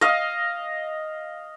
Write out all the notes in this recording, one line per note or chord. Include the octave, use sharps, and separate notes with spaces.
D#5 F5